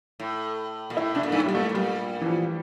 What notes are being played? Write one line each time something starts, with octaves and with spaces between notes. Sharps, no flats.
A2
A#2
A2 E4
C3 D4
A#2
G2
A2
A#2 G3
A3
A2
A#2 G3
E3
F3